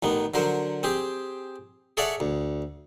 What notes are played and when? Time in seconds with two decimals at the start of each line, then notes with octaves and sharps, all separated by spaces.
0.03 A1 D#3 B3
0.34 D3 F#3 A#4 C5
0.83 C4 G4 G#4
1.97 G#4 A4 C#5 D5 E5 F#5
2.20 D2